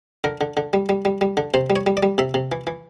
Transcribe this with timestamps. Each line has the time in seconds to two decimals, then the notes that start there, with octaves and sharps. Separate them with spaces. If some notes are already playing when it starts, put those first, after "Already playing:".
0.24 D3 A#4
0.41 D3
0.57 D3
0.73 G3
0.89 G3
1.05 G3
1.21 G3
1.37 D3
1.54 C3 C5
1.70 G3
1.76 C#5
1.86 G3
1.97 D5
2.03 G3
2.18 C3 E5
2.34 C3
2.52 E3
2.67 E3